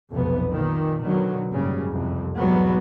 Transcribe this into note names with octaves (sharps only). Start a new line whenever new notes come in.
F1 B1 F2 B3
A#2 D#3
B2 D3 D#3 F#3
F#1 G#2 C#3 G3
C2 F2
B1 E2 G#2 F#3 G3 B3